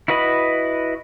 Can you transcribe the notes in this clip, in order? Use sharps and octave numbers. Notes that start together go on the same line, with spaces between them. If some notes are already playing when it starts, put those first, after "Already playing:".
E4 F#4 B4 D#5 B5